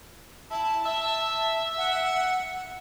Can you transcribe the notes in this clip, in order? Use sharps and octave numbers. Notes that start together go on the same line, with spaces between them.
E4 A5
E5
F#5